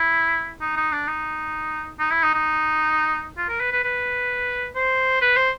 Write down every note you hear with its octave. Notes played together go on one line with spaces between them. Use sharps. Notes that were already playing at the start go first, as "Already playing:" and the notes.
Already playing: E4
D#4
D#4
D4
D#4
D#4
E4
D#4
D#4
F4
A#4
B4
B4
B4
C5
B4
C5